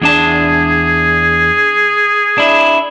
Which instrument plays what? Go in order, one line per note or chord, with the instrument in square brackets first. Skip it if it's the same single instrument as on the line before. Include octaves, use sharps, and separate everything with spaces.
[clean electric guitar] E2 D4 A5 [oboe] G#4
[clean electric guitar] D4 E4